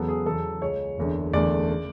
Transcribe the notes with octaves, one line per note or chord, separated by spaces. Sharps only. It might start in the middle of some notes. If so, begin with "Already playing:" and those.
Already playing: E2 C#3 F#3 B3 A4
G#4
E2 C#3 F#3 A4
C#2 C#3 G#3 C#5
F#1 E2 D3
F#1 E2 D3 A3 D5
C#3